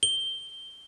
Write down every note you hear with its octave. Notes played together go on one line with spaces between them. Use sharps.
G7